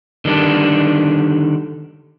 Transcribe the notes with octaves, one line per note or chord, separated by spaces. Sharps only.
D3 D#3 G3 D4